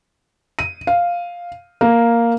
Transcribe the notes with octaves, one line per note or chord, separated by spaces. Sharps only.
D#7
F5
A#3